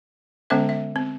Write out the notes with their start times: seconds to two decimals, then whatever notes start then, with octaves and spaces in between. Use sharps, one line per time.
0.50 D3 G#3 B3 C#4 C5 E5
0.69 E5
0.96 C4